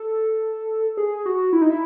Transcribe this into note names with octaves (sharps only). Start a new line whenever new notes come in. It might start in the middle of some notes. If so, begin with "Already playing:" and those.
Already playing: A4
G#4
F#4
E4
D#4
E4